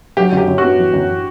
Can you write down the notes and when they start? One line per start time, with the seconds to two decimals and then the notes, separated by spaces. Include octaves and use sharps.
0.17 F#3 G4
0.32 F#2 G4
0.48 F#2
0.58 F#4
0.63 B3
0.79 E3
0.94 F#2